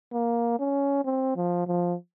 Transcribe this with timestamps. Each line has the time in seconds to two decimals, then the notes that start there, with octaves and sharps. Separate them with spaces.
0.13 A#3
0.59 C#4
1.05 C4
1.37 F3
1.67 F3